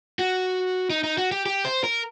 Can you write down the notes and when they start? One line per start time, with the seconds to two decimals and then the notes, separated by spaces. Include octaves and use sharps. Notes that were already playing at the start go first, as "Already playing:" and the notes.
0.19 F#4
0.90 D#4
1.04 D#4
1.18 F#4
1.32 G4
1.46 G4
1.65 C5
1.84 A#4